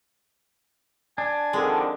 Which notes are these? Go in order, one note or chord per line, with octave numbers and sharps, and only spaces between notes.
D4 G#5
F2 D3 D#3 G#3